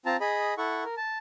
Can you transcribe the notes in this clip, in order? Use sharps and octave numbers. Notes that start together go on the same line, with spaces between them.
C4 F4 A5 A#5
G#4 D#5 B5
E4 A4 F#5 C#6
A#4
A5